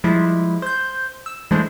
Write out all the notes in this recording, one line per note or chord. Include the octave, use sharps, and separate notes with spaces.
F3 G3 G#3 E4
C5 G6
E6
E3 G#3 A3 D4 C5